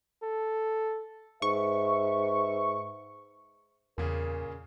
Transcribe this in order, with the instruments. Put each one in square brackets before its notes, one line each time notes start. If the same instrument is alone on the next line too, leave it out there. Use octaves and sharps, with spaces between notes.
[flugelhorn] A4
[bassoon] G#2 [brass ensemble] B4 E5 [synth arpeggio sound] C#6
[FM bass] E2 [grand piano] A#2 C#3 G#4 [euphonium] A#4